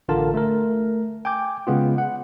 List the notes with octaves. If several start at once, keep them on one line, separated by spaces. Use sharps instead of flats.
A1 D3 F4 A#4 A5
A3 A#4
G5 G#5 D6 G6
C#3 G#3 B3 F4
F#5